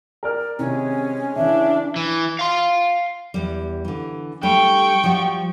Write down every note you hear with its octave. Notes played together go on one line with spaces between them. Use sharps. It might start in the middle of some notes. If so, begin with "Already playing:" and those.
A#4 D5 F6
C3 D#3 G#3 C#4
C#3 E3 D4 E5
E3
F5 C6
E2 G3
D3 E3
G3 A3 D4 G5 C#6
F3 G3 F#4